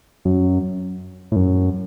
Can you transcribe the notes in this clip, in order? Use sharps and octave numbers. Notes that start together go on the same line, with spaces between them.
F#2
A2
F#2